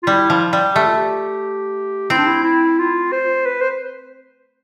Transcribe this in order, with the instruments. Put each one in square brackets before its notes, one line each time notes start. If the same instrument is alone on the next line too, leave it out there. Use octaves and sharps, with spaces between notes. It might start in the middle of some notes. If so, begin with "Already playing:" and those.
[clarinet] F4
[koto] G3 [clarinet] E4
[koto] F3
G3
[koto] A3 [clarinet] G4
[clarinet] F4
G4
[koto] C4 [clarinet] E4
[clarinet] D4
E4
E4
F4
C5
B4
C5